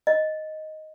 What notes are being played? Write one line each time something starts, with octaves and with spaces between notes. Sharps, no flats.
D#5